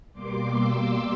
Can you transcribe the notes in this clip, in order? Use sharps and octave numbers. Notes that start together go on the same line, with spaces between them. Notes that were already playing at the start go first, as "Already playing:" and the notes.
B2 G3 A#3 C6 D6
D6 E6